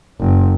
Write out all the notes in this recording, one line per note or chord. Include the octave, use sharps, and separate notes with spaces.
F#1